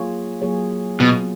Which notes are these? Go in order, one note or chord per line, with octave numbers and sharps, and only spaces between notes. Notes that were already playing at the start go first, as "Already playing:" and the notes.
Already playing: F#3 A#3 F4 G#4 C#5
F#3 A#3 F4 G#4 C#5
B2 F#3 B3 F4